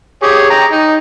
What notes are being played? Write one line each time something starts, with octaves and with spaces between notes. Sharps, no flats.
G4 G#4 C#5
G5 A#5
D#4